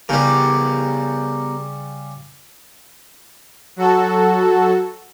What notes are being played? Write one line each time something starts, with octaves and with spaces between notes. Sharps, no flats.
C#3 G3 B3 G4 A#4
F#3 F#4 A4